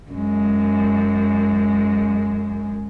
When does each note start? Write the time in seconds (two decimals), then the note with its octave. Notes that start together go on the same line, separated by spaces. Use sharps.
0.11 F#2 G#3